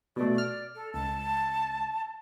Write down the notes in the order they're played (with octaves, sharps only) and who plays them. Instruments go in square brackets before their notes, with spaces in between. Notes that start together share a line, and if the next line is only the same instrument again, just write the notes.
[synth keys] B2 A3 [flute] D5
[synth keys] F6
[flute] A4
[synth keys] C#2 [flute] A5